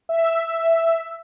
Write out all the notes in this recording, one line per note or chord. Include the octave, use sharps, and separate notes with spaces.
E5